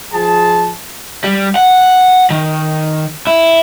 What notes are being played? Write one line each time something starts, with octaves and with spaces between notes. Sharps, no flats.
F3 G#4 A5
G3
F#5
D#3
E4